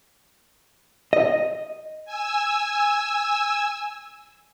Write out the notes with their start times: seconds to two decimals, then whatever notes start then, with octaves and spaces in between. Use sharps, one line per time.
1.13 D#5
2.05 G#5 E6